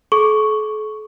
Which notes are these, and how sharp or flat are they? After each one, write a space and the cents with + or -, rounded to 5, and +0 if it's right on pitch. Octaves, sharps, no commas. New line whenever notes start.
A4 -45 C#6 +0